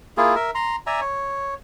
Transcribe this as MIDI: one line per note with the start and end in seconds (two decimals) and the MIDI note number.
0.17 0.35 58
0.17 0.35 64
0.17 0.35 65
0.17 0.35 68
0.35 0.51 70
0.35 0.51 76
0.55 0.76 82
0.55 0.76 84
0.87 1.00 74
0.87 1.00 76
0.87 1.00 80
0.87 1.00 82
1.01 1.54 73